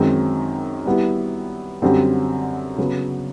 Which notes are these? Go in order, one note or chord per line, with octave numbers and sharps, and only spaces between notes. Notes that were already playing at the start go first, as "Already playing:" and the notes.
Already playing: F#2 D#3 G#3 C4
G3 B3 E4
F#2 D3 G3 C4
C#3 F#3 B3